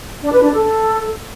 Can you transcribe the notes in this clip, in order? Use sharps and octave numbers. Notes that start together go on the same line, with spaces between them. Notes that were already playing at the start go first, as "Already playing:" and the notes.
D4
B4
D4
A4